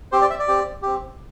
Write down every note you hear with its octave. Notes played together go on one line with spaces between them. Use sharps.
C4 G4 C5
D5
E5
D5
C4 G4
C4 G4